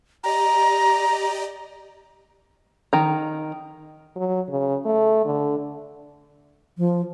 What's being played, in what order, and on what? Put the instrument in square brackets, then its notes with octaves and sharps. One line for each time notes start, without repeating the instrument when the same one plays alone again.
[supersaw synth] G4 D5 D#5 [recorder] A#5
[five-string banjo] D#3 A#5
[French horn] F#3
C#3
A3
D3
[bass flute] F3